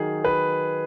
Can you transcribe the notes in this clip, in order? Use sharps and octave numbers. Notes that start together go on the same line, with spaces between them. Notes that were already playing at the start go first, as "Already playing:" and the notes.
Already playing: D#3 F#3 D#4 G#4
B4